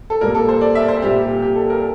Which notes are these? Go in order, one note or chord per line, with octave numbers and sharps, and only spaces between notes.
A4
A#2 G3 A#3 A#4
A4
C5
D5
E5
C5
A#2 G3 A#3 G4
G4
G4
A4
A#4